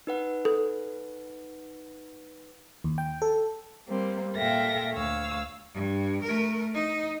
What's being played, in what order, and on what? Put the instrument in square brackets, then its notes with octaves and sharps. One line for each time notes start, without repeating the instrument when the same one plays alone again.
[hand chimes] D#4 B4 F#5
[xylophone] A4
[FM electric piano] D#2
G5
A4
[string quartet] G3 A#3 C4
A#2 A4 E5 F5 G5 A#6
D2 C#5 F5 E6
[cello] G2
A3 A#4
D#4